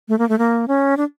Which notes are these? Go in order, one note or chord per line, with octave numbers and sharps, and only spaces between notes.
A3
A#3
A3
A#3
C#4
D4